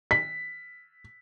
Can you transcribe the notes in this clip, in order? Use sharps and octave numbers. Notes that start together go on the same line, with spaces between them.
B6